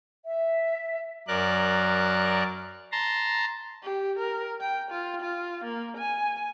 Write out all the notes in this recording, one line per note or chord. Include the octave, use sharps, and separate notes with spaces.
E5
F#2 A#4 D5 F#6
A5 A#5 C6
G4
A#4
G5
F4
F4
A#3
G#5